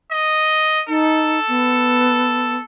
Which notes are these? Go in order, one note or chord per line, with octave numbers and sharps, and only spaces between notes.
D#5
D#4 A4
B3